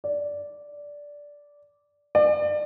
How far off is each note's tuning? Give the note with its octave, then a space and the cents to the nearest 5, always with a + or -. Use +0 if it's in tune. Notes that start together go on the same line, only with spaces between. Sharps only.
D5 -10
D5 +30